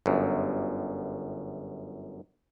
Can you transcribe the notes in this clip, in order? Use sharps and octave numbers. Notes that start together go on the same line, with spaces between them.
G1 F#2